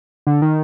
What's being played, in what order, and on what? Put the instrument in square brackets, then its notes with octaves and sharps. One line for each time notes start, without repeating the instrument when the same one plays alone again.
[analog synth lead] D3
D#3